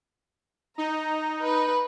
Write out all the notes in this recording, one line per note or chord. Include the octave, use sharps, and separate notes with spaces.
D#4 A#5
B4